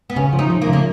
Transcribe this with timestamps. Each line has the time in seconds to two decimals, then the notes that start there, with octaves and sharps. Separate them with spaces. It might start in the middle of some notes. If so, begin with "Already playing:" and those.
0.10 B3
0.16 C#3 C#4
0.33 F3
0.39 D#4
0.50 F3
0.62 A#3
0.67 C#3
0.73 A#3